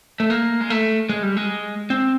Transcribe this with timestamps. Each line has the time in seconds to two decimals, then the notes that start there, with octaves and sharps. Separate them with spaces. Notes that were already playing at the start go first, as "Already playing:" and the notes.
0.20 A3
0.30 A#3
0.61 G#3
0.70 A3
1.09 G#3
1.23 G3
1.37 G#3
1.90 C4